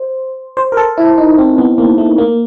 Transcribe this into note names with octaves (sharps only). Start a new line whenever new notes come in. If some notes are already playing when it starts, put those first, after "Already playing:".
Already playing: C5
C5
A#4
A4
E4
D#4
C4
B3
A#3
A3
A#3